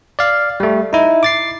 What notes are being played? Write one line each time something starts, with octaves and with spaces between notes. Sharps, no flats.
D5 F5
G3 A3
D#4 E4
D6 A6 C7